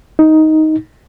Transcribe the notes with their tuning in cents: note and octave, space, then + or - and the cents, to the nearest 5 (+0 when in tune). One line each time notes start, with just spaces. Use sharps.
D#4 +10